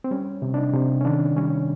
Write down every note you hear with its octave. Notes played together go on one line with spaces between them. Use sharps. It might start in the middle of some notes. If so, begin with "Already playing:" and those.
C4
G3 C#4
C3
D4
D#4
C3
C#4
D#3 D4
G3 C#4